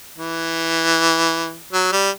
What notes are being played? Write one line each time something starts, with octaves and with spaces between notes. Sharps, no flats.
E3
F#3
G3